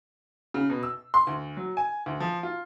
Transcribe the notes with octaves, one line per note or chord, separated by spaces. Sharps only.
C#3
B2
E6
C6
D2
F#3
G#5
D2
F3
F4